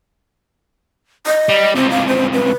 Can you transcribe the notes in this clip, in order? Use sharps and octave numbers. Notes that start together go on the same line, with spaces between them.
D#5
G3
C#2 C3 C4
F5
C5
B4